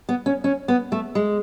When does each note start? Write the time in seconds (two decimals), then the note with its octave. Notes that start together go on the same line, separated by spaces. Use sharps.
0.09 B3
0.26 C#4
0.44 C#4
0.68 B3
0.92 A3
1.15 G#3